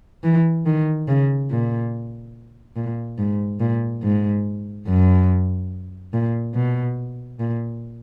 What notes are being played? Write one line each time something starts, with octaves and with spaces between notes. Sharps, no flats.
E3
D#3
C#3
A#2
A#2
G#2
A#2
G#2
F#2
A#2
B2
A#2